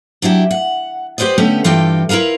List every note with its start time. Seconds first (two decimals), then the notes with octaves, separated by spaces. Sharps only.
0.22 F#3 D4 E4 G4
0.51 F#5
1.18 G4 B4 C5 D5 D#5
1.38 D3 A3 B3 C#4 G4
1.64 G2 E3 F4 G4 A4 G5
2.09 E4 F4 A#4 B4 F5